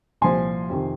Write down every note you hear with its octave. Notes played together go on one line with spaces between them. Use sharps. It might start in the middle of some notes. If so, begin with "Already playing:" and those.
C2 A#2 F3 G#5 C6
F2 C3 D#3